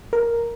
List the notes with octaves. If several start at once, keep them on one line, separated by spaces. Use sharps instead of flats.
A#4